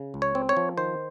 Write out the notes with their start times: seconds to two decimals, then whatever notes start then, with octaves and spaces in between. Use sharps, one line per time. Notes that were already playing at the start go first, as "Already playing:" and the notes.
Already playing: C#3
0.14 C#2
0.22 C#5
0.35 C4
0.49 C#5
0.57 F3
0.78 D#3 C5